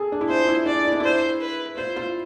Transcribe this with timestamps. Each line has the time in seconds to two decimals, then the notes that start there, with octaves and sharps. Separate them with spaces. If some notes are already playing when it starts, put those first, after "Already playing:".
Already playing: G#4 A4
0.12 D4
0.21 E4
0.29 F4 C5
0.48 E4
0.66 D4 D5
0.85 E4
0.92 D4
1.00 E4 C5
1.40 B4
1.77 F4 C5
1.96 F4